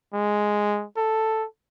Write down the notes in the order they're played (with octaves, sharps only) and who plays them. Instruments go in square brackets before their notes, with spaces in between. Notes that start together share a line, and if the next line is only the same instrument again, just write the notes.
[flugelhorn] G#3
A4